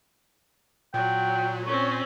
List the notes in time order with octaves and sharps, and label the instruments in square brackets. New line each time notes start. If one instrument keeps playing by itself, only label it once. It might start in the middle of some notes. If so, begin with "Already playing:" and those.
[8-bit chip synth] A#2 [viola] F#3 [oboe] G5
[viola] C4 C#4 [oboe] C#5